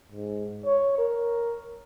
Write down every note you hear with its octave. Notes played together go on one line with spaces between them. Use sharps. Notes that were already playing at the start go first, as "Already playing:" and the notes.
G#2
C#5
A#4